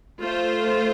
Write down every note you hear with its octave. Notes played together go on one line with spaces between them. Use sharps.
A3 F4 C5